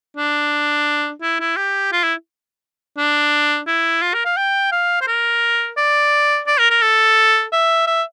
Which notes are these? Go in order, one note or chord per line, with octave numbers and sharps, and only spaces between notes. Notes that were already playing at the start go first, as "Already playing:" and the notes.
D4
E4
E4
G4
F4
E4
D4
E4
F4
A#4
F5
G5
F5
C5
A#4
D5
D5
A#4
A#4
A4
E5
E5